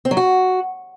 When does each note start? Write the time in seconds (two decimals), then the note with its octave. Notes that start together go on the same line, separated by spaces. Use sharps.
0.05 C4
0.11 F#3
0.17 F#4